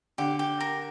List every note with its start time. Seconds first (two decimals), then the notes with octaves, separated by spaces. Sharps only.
0.18 D3 G4
0.39 G4
0.60 A#4